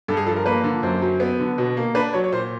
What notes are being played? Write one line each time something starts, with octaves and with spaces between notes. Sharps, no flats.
G2 A4
G#4
F3 A4
A#4
A#3 B4
D3
F#2 C5
F#3
B3
D3
B2
A#3
D4 B4
F#3 C#5
C#5
A#2 C5